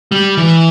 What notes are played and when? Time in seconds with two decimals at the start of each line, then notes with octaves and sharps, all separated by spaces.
0.12 G3
0.37 E3